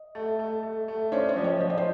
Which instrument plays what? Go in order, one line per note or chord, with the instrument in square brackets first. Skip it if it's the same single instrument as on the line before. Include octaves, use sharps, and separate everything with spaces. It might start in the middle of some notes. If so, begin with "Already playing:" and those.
Already playing: [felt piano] D#5
[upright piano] A3
A3
A3
A3
[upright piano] C#4 [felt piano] C5 D5
[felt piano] C5 D5
[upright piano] F3
[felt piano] C#5 D#5
[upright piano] F3 [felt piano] D5
[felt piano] D#5
C5 D5